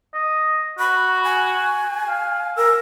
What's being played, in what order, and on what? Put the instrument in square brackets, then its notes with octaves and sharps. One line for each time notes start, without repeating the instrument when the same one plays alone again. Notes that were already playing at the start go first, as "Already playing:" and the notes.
[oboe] D#5
[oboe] F#4 [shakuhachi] B5
[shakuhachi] G#5
[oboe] F5
[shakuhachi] A#4 [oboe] E6